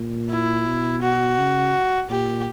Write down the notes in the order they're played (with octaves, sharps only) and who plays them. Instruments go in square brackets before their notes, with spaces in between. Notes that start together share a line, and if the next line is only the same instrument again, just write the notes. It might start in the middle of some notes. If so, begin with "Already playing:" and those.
Already playing: [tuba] A#2
[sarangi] E4
[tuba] B2
[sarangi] F#4
[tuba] C#3
[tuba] A#2 [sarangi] G4